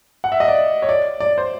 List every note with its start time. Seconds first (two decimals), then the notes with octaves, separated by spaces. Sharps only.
0.24 F#5
0.32 E5
0.40 D#5
0.48 D5
0.82 C#5
0.89 D5
1.20 D5
1.38 C5